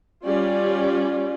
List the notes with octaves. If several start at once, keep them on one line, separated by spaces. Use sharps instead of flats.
G3 C#4 F4 G4 D5